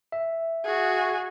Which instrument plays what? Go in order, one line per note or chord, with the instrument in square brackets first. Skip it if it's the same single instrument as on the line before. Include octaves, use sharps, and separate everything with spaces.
[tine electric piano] E5
[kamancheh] F#4 G#4